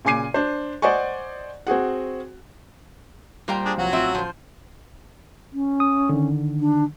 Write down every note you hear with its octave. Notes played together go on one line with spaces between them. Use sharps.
A#2 C#3 G#5 D6 C7 D#7
D4 C5
C5 D5 D#5 F#5 G#5 C#6
C4 F#4 G#4 F#5
A#2 G3 C5 F5 G5 A#5
D4 G#4
C2 F3 F#3 F#4
A1 C4 F4 E5
F3 C5
C#4
D#6
D3 D#3
D4